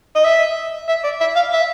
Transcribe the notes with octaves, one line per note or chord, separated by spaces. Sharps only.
D#5
E5
E5
D5
E5
F5
E5